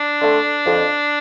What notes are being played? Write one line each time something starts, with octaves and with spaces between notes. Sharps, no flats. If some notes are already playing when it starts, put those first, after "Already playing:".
Already playing: D4
D3 A3 C4
F2